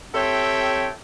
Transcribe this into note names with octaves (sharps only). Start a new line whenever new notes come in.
C4 G4 A4 C#5 E5 G5